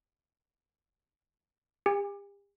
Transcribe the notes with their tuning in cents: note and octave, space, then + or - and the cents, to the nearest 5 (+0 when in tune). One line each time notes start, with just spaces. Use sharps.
G4 +40 G#5 -35